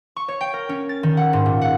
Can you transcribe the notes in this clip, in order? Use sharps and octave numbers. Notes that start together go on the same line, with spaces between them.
C#6
C#5
G5
A#4
C#4
A6
D#3
F#5
G#2
A#2
F#5